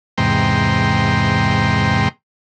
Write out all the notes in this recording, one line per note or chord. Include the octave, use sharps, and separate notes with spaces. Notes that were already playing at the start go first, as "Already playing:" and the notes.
E2 G#2 C3 G5 A#5 C6